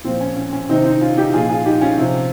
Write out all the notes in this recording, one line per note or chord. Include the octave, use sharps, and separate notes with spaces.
A#2 F3 C4
C#4
C#4
C#4
C3 D#3 C4 D#4
C4 D#4
C#4 F4
D#4 G4
A#2 F3 F4 G#4
F4 G#4
D#4 G4
C#4 F4
C3 F3